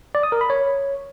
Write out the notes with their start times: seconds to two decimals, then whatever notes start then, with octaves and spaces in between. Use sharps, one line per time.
0.15 D5
0.23 D#6
0.32 A#4
0.41 B5
0.50 C#5